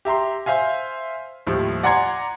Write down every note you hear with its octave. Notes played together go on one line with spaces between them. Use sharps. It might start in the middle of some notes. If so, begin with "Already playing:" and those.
G4 E5 A#5 C6
C5 E5 F5 G#5
D#2 A2 F3 G3
D5 F#5 G#5 A#5 C6 G#6